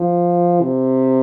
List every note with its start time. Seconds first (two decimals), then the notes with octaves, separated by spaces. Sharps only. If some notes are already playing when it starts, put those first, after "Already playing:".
Already playing: F3
0.61 C3